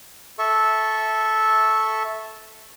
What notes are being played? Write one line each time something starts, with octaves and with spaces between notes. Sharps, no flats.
A4 E5 C#6